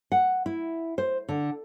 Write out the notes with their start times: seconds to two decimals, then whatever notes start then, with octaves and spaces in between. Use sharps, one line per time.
0.12 F#5
0.46 E4
0.98 C5
1.29 D3